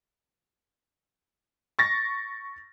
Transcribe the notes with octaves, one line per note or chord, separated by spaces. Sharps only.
C#6 A6 A#6